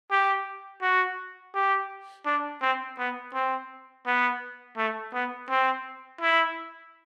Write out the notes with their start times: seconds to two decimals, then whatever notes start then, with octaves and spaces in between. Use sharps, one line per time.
0.11 G4
0.82 F#4
1.55 G4
2.26 D4
2.61 C4
2.98 B3
3.34 C4
4.06 B3
4.77 A3
5.13 B3
5.49 C4
6.21 E4